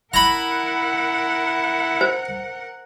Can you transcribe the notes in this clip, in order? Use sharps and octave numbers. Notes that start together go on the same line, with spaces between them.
E4 A#4 F#5 A#5 B5
C5